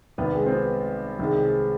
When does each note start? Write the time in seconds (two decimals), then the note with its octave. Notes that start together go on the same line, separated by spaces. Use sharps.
0.18 C2 C3 D#3 B3
0.35 G#3
0.46 C4
0.52 B3
1.19 C2 C3 D#3 G#3